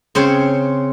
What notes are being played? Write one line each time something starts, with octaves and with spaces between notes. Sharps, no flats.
C#3 C4 C5 C#5